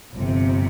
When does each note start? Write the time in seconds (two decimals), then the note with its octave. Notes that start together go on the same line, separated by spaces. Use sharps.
0.14 G1 F2 C3